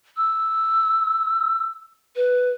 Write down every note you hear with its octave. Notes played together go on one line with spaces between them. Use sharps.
E6
B4